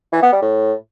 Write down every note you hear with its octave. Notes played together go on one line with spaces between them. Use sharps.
E3
B3
G3
A2